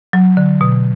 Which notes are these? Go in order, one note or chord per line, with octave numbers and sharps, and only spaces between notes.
F#3
D3
B2